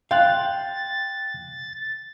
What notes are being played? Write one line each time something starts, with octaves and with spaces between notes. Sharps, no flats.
F5 G5 C6 F#6 A6